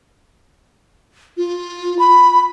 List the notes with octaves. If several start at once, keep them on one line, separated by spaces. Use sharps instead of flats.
F4
B5